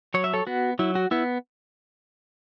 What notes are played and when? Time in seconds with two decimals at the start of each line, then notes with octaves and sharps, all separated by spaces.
0.14 F#3 C#5
0.24 E5
0.33 A4 C#5
0.47 B3 F#4
0.79 F#3 E4
0.95 F#4
1.11 B3 E4